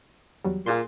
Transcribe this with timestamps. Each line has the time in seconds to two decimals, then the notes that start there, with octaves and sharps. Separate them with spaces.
0.45 E2 F#3 G3
0.66 A#2 F4 G#4 C6